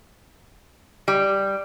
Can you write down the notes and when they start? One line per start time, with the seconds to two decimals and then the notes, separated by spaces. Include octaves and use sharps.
1.08 G3